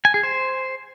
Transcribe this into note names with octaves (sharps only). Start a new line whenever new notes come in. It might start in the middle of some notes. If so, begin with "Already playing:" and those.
G#5
G#4
C5